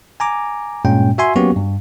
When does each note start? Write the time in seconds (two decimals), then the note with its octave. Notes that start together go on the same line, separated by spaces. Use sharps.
0.20 G#5 A#5 D6
0.85 G2 A#2 G#3 C#4 G5
1.18 F#4 E5 G#5 C6
1.36 F#3 A#3 B3 C#4 F#4 G4
1.56 G2